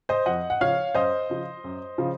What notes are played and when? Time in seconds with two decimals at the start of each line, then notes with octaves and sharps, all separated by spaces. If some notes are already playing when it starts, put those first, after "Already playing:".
0.09 C5 D#5
0.26 F2 D#5 F#5
0.50 F#5
0.61 C#3 F3 C#5 F5
0.95 F#2 C5 D#5
1.30 C#3 F3
1.64 F#2
1.98 C#3 F3